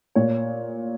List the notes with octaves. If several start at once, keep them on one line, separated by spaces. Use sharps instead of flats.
A#2 C#5